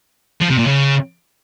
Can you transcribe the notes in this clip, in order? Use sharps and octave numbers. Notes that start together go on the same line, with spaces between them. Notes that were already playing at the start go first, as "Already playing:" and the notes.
F3
C3
A#2
C#3